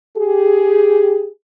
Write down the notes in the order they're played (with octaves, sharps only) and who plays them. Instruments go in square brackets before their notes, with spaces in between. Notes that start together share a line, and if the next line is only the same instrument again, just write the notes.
[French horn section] G4 G#4